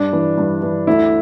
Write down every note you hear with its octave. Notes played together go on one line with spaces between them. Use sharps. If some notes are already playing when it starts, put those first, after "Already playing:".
Already playing: G2 D4
E3
G2
E3
D2 E4